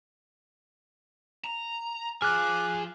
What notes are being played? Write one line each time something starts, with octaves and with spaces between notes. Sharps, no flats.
A#5
F3 G#4 D6 F6 F#6